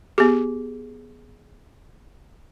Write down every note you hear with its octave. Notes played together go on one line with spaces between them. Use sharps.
B3 G4 G#4